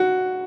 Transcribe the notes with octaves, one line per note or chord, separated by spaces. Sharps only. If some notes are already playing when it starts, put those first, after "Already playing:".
Already playing: F#4